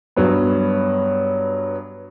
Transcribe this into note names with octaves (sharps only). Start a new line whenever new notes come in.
G2 F#3 B3